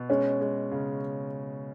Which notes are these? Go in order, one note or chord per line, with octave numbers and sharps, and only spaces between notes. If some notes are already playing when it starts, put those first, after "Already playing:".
Already playing: B2
G#3 C#4
G#3
C#3